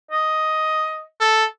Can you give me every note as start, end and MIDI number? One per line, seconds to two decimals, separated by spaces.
0.11 1.03 75
1.20 1.45 69